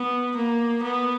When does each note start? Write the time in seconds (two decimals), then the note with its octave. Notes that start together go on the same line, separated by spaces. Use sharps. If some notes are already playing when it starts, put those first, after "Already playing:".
Already playing: B3
0.36 A#3
0.83 B3